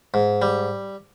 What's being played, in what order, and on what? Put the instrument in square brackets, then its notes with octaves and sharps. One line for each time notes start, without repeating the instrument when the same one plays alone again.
[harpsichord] G#2
G3